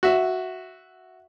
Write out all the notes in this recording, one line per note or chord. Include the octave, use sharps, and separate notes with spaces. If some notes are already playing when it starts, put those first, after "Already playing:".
F#4 E5